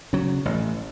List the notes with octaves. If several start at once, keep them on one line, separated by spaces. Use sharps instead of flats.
C#3 F#3
A1